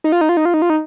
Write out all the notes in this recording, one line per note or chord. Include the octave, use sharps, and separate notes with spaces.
D#4
F4
D#4
F4
D#4
F4
D#4
F4
D#4